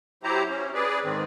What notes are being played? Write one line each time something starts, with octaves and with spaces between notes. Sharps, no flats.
F#3 E4 G4 C5 A#5
C#4
G#4 B4 D5
G#2 D#3 C4